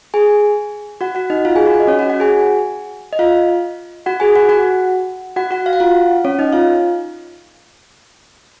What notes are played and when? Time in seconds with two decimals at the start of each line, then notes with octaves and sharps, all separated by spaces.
0.14 G#4 G#5
1.01 F#4 F#5
1.15 F#4 F#5
1.30 D#4 D#5
1.45 F4 F5
1.55 G#4 G#5
1.66 F#4 F#5
1.80 D#5
1.87 C#4 C#5
1.99 F#4 F#5
2.10 F#4 F#5
2.20 G#4 G#5
3.13 D#5
3.19 F4 F5
4.06 F#4 F#5
4.20 G#4 G#5
4.36 F#4 F#5
4.49 F#4 F#5
5.36 F#4 F#5
5.51 F#4 F#5
5.66 F5
5.73 F#5
5.80 F4 F5
6.25 C#4 C#5
6.39 D#4 D#5
6.53 F4 F5